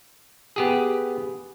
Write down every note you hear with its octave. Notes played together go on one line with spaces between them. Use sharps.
B3 G4 G#4